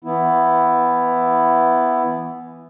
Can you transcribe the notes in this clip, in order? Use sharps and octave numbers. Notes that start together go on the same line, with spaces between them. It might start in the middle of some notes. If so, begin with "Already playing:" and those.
E3 B3 E4